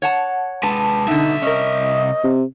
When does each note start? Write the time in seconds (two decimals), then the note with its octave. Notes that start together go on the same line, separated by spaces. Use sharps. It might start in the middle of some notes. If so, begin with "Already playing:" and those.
0.02 C#5 F#5 A5
0.63 G#3 B4 A5
1.07 C2 B2 D3 D#4 E5
1.42 C#4 A#4 D#5
2.24 C3